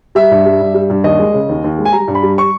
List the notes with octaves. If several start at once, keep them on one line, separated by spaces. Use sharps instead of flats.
G3 E5
G2
G3
G2
G3
G2
D#2 D#5
G#3
C#3
D#2
D#2
G#3
G#5
G3 A#5
G2
B5
G3
C#6